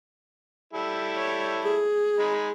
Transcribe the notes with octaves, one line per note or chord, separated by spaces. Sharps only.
G3 E4 A4
C#5
G#4
G#3 D#4 B5